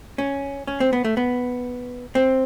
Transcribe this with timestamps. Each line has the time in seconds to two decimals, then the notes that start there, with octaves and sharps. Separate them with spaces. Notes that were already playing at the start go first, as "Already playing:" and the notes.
0.18 C#4
0.67 C#4
0.80 C4
0.93 B3
1.05 A3
1.17 B3
2.15 C4